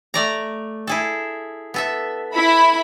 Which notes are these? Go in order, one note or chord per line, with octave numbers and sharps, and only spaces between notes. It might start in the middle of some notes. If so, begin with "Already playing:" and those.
A3 D5 A#5
E4 G#4 A4
B3 A4 E5
E4 B5